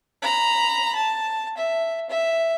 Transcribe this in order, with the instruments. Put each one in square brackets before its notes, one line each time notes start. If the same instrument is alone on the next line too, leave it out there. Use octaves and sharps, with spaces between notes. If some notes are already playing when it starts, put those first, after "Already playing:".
[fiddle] A#5 B5
A5
E5
E5